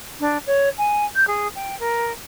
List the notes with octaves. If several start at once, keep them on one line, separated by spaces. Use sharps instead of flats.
D4
C#5
G#5
G6
G#4
G5
A#4